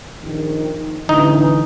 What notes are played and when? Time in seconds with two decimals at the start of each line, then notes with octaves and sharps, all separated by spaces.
0.24 A#1 D#3
1.09 A1 D3 E3 D#4